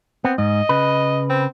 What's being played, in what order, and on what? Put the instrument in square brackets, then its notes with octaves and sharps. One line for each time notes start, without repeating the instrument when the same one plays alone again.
[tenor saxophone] B3 [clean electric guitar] C4
[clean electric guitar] G#2 [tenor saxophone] D#5
[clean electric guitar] C#3 B4
[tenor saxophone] C4